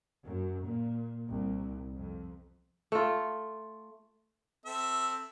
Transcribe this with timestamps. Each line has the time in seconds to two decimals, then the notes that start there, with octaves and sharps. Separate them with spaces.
0.25 F#2
0.65 A#2
1.29 C2
1.94 F2
2.92 A3 F4
4.66 C4 A4 E5